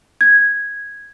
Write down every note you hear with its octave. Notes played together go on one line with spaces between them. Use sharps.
G#6